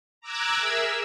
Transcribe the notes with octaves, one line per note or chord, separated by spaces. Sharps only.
A#5 D6 E6 F#6 G#6
G#4 A#4 E5 E6